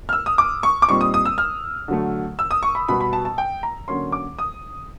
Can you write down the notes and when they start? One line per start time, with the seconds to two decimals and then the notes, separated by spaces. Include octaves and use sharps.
0.09 F6
0.13 E6
0.26 D#6
0.38 D6
0.63 C#6
0.82 D6
0.88 A#2 G3 C4 D#4 C#6
1.01 D#6
1.14 D#6
1.25 E6
1.38 F6
1.88 D3 F#3 A3
2.39 E6
2.51 D#6
2.63 C#6
2.75 B5
2.88 B2 G3 B3 B5
3.00 B5
3.13 A5
3.25 A5
3.38 G5
3.63 A#5
3.88 D3 F#3 A#3 C#4 C6
4.12 D6
4.39 D#6